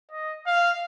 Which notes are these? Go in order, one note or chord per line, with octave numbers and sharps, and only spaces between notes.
D#5
F5